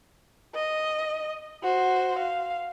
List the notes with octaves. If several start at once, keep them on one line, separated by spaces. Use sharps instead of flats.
D#5
F#4 C5
F5